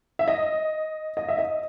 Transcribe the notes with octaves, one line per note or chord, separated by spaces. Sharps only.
E5
D#5
D#5
E5
D#5